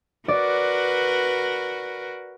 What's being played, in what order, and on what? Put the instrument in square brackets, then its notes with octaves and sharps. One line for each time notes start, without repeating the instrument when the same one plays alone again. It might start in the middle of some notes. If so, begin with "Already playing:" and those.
[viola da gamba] F#4 A#4 B4 [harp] D5